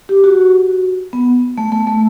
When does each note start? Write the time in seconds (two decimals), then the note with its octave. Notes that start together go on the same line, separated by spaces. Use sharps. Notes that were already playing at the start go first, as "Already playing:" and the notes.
0.09 G4
0.24 F#4
1.13 B3
1.58 A3
1.72 A3
1.87 A3